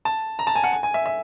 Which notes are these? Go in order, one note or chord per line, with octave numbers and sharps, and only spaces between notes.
A5
A#5
A5
G#5
F#5
G#5
G#5
E5
E5